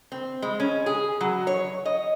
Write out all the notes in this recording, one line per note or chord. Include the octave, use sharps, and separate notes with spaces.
C4
G#3
C#4
G#4
F#3
C#5
D#5